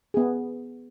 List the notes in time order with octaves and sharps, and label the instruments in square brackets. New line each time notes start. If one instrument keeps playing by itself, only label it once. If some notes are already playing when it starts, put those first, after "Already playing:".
[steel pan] B3 G#4